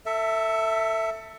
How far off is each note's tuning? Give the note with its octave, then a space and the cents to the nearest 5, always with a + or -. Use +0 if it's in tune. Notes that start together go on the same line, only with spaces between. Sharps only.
A4 +25 E5 +0